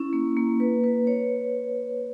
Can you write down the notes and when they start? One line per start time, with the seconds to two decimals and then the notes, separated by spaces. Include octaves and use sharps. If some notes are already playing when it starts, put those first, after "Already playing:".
Already playing: C#4 E4
0.13 A#3
0.37 A#3
0.60 B4
0.84 B4
1.07 C#5